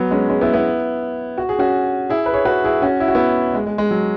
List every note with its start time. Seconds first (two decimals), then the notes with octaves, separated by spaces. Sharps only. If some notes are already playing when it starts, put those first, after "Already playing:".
Already playing: F#3 B3
0.11 G#3 C#4
0.29 G#3 C#4
0.41 B3 E4
0.53 B3 E4
1.38 F#4
1.49 G#4
1.59 C#4 F#4
2.09 E4 G#4
2.26 B4
2.33 G#4 C#5
2.45 F#4 B4
2.64 E4 G#4
2.82 C#4 F#4
3.00 E4
3.08 F#4
3.15 B3 E4
3.54 G#3
3.66 G#3
3.78 G#3
3.91 F#3